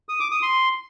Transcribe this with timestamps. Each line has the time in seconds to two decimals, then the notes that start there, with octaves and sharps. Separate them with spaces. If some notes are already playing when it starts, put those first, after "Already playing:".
0.09 D#6
0.20 D6
0.31 D#6
0.42 C6